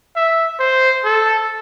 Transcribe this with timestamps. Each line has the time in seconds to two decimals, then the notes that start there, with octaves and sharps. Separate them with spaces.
0.16 E5
0.60 C5
1.04 A4